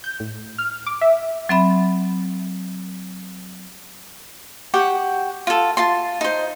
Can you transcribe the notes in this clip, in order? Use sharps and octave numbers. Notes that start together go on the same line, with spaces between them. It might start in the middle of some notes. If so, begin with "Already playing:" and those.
G6
A2
F6
D6
E5
F#3 C4 E5 B5
F#4 G4 F#5
F4 A4
F4 A5 C6
D#4 C5